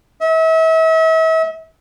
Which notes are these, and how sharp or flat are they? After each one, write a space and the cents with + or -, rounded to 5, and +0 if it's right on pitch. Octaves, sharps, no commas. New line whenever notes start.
E5 -40